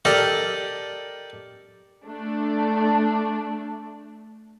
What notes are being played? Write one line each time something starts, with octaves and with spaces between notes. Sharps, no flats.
G4 A4 A#4 D5 D#5
A3 D4